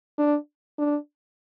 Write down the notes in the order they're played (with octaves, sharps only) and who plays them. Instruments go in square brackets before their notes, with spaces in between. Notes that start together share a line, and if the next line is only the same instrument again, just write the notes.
[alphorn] D4
D4